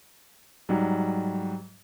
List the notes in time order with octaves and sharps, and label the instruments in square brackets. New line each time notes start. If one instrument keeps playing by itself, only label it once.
[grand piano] G#2 F#3 G3